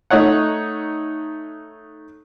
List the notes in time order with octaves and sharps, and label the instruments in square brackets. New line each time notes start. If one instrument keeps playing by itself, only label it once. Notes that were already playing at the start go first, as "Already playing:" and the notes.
[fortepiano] A3 D#4 C#5 F#5